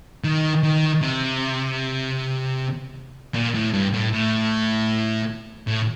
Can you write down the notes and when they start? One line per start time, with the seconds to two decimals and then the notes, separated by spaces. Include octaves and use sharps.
0.24 D#3
0.63 D#3
1.01 C3
3.35 A#2
3.55 A2
3.73 G2
3.93 A2
4.13 A2
5.68 A2